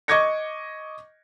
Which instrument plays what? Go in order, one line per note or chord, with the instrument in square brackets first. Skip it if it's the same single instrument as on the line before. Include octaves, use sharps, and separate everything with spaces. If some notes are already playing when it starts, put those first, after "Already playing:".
[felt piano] D#5 C#6 D6 G#6 A#6 C#7